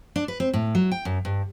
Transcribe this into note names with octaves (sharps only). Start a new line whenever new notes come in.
D4
B4
C4
A2
F#3
G5
F#2
G2